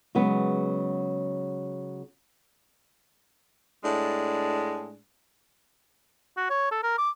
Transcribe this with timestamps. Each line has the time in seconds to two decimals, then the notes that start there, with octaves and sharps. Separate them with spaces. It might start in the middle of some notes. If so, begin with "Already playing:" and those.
0.15 C#3 F#3 G#3 B3
3.83 A2 G#3 D4
6.37 F#4
6.50 C#5
6.71 A4
6.83 A#4
6.98 D6